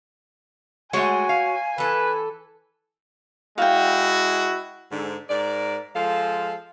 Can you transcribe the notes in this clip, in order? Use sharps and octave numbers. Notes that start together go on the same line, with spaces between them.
G#3 A3 F#4 C#5 G#5
F5
E3 A4 B4
G#3 E4 F#4 F5 G5
G#2 D3
G#2 A#4 D5
F3 G#3 A4 F5